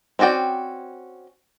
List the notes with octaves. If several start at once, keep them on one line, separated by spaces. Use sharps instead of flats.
C4 C#4 F#4 D5 G5